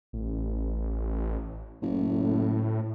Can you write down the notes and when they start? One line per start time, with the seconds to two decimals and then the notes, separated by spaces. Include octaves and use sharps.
0.13 A1
1.82 F#1 A2